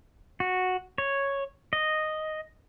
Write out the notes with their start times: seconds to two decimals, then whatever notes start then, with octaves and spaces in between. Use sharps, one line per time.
0.40 F#4
0.98 C#5
1.73 D#5